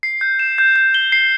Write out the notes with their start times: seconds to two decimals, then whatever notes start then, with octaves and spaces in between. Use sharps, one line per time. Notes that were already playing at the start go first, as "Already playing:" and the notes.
0.03 C7
0.21 G6
0.39 E7
0.58 G6
0.76 G6
0.94 G7
1.12 C7